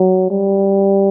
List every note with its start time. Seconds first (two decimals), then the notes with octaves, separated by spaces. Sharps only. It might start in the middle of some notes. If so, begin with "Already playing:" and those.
Already playing: F#3
0.30 G3